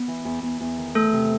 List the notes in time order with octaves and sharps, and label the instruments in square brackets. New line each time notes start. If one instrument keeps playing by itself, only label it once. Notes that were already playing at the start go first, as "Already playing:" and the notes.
Already playing: [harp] B3
E3
E2
E2
E2
D#3
[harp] E3 [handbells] A3 A4
[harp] C3